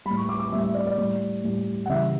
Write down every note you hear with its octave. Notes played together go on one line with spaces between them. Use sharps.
A2 G3 B5
C#6
D6
D6
A2 G3 E5
E5
D5
D5
A2 G3
A2 G3
F#5
C#3 E3 G3 E5